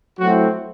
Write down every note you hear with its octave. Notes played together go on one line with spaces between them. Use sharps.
F#3 A3 C4 E4 F#4